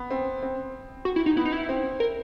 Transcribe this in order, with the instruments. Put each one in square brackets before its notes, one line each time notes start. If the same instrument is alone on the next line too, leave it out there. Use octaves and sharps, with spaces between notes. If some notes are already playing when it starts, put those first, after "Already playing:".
Already playing: [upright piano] B3
C4
C4
[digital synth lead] F#4
E4
D#4
[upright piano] B3 [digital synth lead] E4
[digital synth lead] D#4
E4
[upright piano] C4
[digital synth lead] A#4